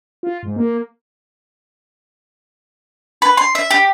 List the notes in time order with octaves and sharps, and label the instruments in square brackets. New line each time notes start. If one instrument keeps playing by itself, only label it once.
[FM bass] F4
G#2
A#3
[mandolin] B4
C6
E5
G4